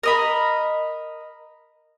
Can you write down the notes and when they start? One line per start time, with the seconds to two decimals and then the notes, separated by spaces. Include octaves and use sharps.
0.03 A#4 D#5 B5